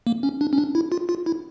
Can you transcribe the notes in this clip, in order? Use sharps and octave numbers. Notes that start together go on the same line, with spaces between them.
A#3
C#4
D4
C#4
D4
E4
F4
F4
E4